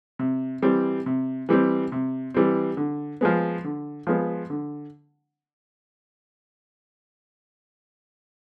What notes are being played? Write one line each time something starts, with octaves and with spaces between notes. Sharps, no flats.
C3
E3 G3 C4
C3
E3 G3 C4
C3
E3 G3 C4
D3
F3 G#3 B3
D3
F3 G#3 B3
D3